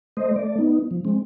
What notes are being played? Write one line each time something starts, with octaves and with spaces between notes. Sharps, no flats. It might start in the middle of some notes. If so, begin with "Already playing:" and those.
A3 C5 D#5
A3 D5
B3 D#4
F3
G#3 C4